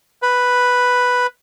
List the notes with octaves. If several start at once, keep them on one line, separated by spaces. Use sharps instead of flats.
B4